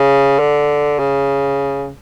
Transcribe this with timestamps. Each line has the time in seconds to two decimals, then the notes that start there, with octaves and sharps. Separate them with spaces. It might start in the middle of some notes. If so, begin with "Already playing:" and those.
Already playing: C#3
0.39 D3
0.99 C#3